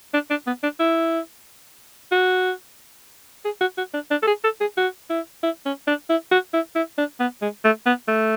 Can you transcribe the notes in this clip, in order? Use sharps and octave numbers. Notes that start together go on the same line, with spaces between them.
D4
D4
B3
D4
E4
F#4
G#4
F#4
F#4
D4
D4
A4
G#4
A4
G#4
F#4
E4
E4
C#4
D4
E4
F#4
E4
E4
D4
B3
G#3
A3
B3
A3